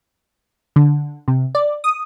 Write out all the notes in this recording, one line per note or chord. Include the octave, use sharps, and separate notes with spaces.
D3
C3
D5
D#6